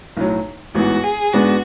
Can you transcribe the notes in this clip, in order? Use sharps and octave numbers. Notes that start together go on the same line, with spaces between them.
B1 A2 F#3
A1 G#2 E3 B3 F#4
G#4
G#2 G#3 B3 D4 F#4